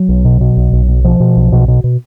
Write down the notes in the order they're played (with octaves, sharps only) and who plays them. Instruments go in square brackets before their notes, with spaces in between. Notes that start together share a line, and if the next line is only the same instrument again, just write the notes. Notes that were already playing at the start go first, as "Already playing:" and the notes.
Already playing: [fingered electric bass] F#3
B1
B2
B2
B1
B1
B2
B2 F3
B2
B1
B2
B2
B2